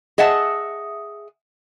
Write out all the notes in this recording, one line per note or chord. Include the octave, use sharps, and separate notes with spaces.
G#4 D#5 E5 F#5 A5